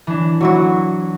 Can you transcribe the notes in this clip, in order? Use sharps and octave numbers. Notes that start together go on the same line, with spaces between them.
E3 D4
F#3 E4 F#4